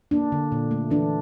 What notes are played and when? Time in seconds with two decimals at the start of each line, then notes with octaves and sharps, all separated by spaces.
0.11 A#3 D4
0.32 D3
0.52 A#2
0.71 A3
0.90 E3 D4